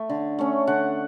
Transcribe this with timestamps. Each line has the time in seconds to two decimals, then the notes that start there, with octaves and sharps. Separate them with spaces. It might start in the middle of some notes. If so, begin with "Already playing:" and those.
Already playing: A3 E5
0.10 D3
0.39 A3 C#4
0.67 D3 F#5